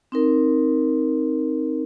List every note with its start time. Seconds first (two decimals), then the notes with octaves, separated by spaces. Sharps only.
0.12 C4 D#4 A#4